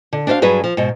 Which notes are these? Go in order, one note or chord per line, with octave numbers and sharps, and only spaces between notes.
D3
D4 F#4 C5 E5 F5
G2 F#3 G#4 B4
F3
G#2 B2